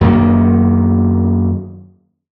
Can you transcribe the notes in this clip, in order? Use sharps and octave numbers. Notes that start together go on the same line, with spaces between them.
F#2 D#3 A#3